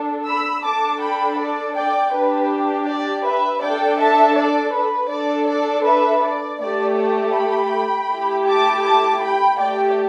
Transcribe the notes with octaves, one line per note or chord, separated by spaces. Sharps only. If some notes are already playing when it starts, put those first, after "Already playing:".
Already playing: D4 A4
B5 E6
D4 A4 A5 D6
G5 B5
D5
D5 G5
D4 G4 B4
D5
B4 E5
D4 A4 D5 G5
E5 A5
D5
B4
D4 A4 D5
D5
B4 E5
D5
A3 G4 D5
D5
G5 B5
A3 E4 G4
A5 D6
A5 D6
G5 B5
A3 G4 D5 G5